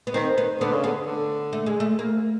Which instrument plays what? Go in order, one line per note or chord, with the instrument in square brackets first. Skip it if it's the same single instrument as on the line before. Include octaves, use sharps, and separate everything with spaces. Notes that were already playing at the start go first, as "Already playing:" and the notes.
[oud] B3
[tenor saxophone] D#3 [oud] C4
[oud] B3
[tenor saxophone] D3 [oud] B3
[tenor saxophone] C#3
[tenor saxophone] D3 [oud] B3
[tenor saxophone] D3
[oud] A3
G#3
A3
A#3